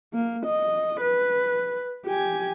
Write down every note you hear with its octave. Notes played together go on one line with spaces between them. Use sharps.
A#3
D#5
B4
G4 G#5